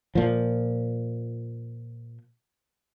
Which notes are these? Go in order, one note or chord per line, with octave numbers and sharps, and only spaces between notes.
A#2 F3